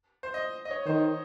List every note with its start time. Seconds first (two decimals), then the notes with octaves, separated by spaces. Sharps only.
0.23 C5
0.34 D#5
0.65 D#5
0.71 C#5
0.86 D#3 C5